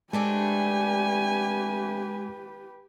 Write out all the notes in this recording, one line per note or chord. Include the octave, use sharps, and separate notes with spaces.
G#3 A3 C4 D4 G4 B4 G#5